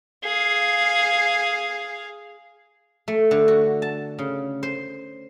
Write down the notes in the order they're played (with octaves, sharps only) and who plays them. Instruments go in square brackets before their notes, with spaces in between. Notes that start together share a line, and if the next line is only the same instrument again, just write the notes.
[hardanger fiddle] G#4 F5
[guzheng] A3
D3
F#4
A5
C#3
C5